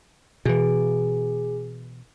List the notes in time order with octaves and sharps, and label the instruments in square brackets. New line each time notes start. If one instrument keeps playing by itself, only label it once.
[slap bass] B2 E3 [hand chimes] G#4